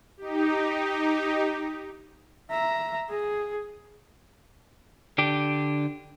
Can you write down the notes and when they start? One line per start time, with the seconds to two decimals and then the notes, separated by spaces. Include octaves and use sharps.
0.17 D#4 G4
2.51 E5 A#5
3.09 G#4
5.18 D3 D4 G4